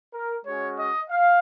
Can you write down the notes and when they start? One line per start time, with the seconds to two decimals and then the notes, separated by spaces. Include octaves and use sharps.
0.14 A#4
0.45 G#3 C#4 F#4 C#5
0.77 D#5
1.10 F5